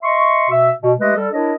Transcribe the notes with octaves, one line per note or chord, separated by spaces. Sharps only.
D#5 E5 C6 C#6
B2 F#4 E5
B2
G#3 A3 G4 B4 D#5
G3 A4
D4 E4 A#4 C#5 D#5